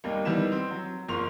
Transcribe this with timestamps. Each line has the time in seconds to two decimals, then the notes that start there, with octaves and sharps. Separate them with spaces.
0.04 D#2 G3 G#3 A#3
0.25 D#3 G3 B3 E4 E7
0.52 C4
0.71 F#3
1.08 F#1 F3 A#4 C6 C#6 F7